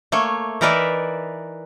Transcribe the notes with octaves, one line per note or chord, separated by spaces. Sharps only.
A3 A#3 C#5
E3 D#4 A#4 B4 D5 E5